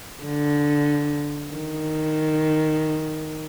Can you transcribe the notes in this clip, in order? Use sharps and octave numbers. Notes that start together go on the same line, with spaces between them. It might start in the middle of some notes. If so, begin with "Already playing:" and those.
D3
D#3